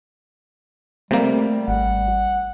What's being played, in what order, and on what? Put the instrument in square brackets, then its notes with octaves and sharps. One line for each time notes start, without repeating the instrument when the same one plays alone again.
[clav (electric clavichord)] C3 A#3 [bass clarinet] G3 [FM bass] A3
[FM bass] G#1 [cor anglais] F#5